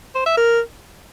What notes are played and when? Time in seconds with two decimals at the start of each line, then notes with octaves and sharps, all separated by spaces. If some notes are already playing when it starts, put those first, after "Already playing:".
0.15 C5
0.26 E5
0.37 A#4